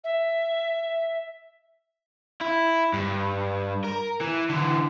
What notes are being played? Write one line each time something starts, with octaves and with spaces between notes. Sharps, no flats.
E5
E4
G2
A#4
E3
D3 E3